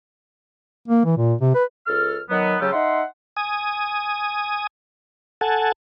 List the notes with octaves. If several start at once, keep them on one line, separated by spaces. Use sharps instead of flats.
A#3
E3
A#2
C3
B4
C#2 A4 F6
D#3 F#3 B3
C#3 F#3 F4 G4 A4
D#4 E5 F#5 C6
G#5 D#6
A4 F#5 G#5 A5